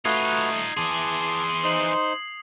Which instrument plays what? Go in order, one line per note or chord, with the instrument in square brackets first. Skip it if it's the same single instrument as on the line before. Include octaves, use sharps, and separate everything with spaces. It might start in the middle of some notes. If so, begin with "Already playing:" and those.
[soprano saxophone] A3 [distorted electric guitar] D#4 F4 [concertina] F#4 B4 [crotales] D#6 G#6 C7
[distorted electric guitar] E3 G#4 [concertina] A5 D6 [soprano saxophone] C6
[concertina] D#4 C5 [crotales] D#6 C7 F#7